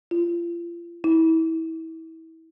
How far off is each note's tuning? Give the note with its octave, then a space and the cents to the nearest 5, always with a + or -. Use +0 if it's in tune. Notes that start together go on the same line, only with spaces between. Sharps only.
F4 -35
E4 -30